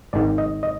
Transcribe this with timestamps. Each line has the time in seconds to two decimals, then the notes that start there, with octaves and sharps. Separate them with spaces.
0.13 G#1 G#2 D#3 D5
0.38 D#5
0.63 D#5